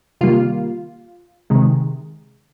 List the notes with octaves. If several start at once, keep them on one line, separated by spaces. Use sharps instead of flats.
C3 D#3 G3 A#3 F4
C3 D#3 G#3